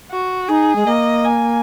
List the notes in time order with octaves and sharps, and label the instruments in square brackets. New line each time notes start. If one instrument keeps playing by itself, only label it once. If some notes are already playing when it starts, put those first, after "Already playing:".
[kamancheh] F#4
[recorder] D#4 [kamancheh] G#4
[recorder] G#3
[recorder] A#3 [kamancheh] D#5
[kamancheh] G#5